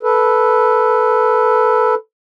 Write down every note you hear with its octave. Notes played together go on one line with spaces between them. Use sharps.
A4 B4